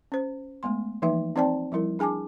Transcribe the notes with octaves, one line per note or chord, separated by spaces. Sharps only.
C#4 C5
G#3 A3 B3 C6
E3 F3 A#3 D#4 B4 E5
C4 D#4 C5 D5 G5 A5
F3 G3 E4 A#4
D4 G#4 G#5 A5 D6